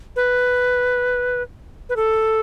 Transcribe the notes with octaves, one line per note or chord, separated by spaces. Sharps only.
B4
B4
A4